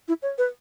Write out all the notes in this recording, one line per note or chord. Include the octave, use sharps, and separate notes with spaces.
E4
C#5
B4